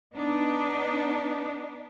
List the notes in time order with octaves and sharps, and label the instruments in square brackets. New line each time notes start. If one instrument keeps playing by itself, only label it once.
[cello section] B3 D4 D#4